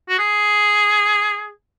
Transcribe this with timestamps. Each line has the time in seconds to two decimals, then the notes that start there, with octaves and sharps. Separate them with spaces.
0.09 F#4
0.19 G#4